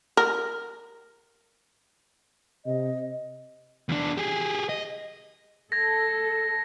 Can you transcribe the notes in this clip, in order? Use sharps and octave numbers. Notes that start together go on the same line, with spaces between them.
A#4
C3 D#5
E2 D4
G4 G#4
D#5
A4 G#6 A#6